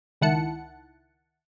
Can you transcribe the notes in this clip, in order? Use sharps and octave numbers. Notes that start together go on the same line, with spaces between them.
C#2 D#3 E4 F#5 A5 C#7